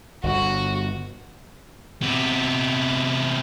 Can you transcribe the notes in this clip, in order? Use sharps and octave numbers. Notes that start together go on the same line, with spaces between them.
G1 F#4
C3 B3